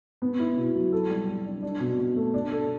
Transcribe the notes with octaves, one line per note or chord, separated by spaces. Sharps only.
B3
E4
B2
F#3
A4
G3
G3
D4
D4
B2
B2
A3
D4
A4